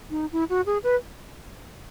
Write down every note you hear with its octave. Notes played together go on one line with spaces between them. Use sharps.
D#4
E4
F#4
G#4
B4